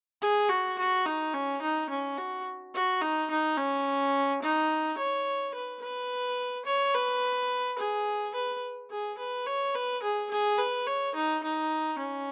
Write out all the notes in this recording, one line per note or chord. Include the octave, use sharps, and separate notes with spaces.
G#4
F#4
F#4
D#4
C#4
D#4
C#4
F#4
F#4
D#4
D#4
C#4
D#4
C#5
B4
B4
C#5
B4
G#4
B4
G#4
B4
C#5
B4
G#4
G#4
B4
C#5
D#4
D#4
C#4